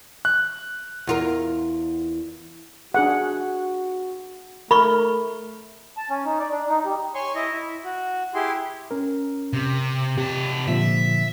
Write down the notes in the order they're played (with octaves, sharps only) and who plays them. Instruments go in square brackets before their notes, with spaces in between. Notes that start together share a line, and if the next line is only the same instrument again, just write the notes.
[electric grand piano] F#6
[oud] E2 F4 A#4
[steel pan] D4 G#4 F#5 [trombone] F#4
[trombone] A3 [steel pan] A#4 [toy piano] B5 C#6
[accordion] A5
C#4
D#4
D5
D4
D#4
G3
[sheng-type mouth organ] C#5 G#5 C6 C#6
E4 D#5
E4
F#4
E4 G4 G#4 C6
[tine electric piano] C#4 A#4
[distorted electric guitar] C3
[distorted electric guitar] C3 A5 [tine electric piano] G4
[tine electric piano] A#2 D3 F3 [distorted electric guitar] E5